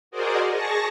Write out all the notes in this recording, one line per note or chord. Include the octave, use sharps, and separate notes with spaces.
F#4 G#4 A#4 C5 D5 D#5
G#4 A5 C#6 A#6